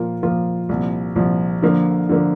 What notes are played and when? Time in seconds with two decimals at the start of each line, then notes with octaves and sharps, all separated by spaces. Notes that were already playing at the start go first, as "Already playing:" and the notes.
Already playing: A#2 F3 A#3 F4
0.23 A#2 F3 A#3 F4
0.69 C2 A#2 F3
1.16 C2 A#2 F3
1.63 D3 F3 A#3
2.09 D3 F3 A#3